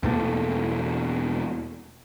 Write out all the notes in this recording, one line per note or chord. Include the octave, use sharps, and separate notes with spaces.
E2 B2 A3 A#3